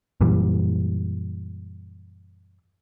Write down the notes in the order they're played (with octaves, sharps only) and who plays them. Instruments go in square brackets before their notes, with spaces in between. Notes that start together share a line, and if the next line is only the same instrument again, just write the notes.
[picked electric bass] F#2 A#2 E3 G3